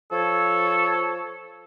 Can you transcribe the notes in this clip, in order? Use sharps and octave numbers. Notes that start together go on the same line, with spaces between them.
F3 A4 C#5